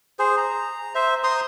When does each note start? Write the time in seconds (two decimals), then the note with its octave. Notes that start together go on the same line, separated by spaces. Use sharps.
0.19 G#4 C5
0.37 A#5
0.95 C5 E5
1.24 C5 A#5 C6 D#6